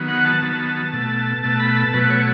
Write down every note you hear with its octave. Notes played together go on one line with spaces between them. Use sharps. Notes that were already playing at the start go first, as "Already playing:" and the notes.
Already playing: D#3 F#3 B3
F#5
A5
D#3 F#3 B3
B2 A3
B2 A3 A5
B5
A5
B2 F#3 A3 B4
C#5